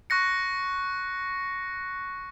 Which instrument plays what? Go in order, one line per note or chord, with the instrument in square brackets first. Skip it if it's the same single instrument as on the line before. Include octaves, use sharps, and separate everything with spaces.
[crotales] C#6 F#6 A#6 C#7